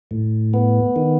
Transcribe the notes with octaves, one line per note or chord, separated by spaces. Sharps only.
A2
B3
D#3